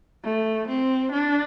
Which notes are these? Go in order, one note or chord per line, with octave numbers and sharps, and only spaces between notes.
A3
C4
D4